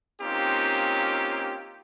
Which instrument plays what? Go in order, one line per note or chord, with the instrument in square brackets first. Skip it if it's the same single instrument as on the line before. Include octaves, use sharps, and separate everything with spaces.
[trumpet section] A#3 C4 C#4 D#4 F4 G4